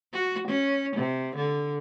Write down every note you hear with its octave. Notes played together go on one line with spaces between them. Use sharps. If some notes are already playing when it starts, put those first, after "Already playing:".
F#4
C#4
C3
D3